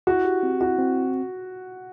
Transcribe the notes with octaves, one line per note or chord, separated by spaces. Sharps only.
E4 F#4
G4
C4
E4 F#4
C4